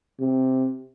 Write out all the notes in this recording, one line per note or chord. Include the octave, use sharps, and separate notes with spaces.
C3